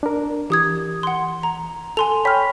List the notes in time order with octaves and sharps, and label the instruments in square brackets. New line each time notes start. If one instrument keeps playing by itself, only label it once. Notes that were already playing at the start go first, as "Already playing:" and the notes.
[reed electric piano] D4 A#4
[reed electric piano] E3 [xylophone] G4 D#6 G#6
[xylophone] F#5 C6
A#5
[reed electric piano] A4 [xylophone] G#5 C6 F7
[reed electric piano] C#5 G5 B5 [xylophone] F6 B6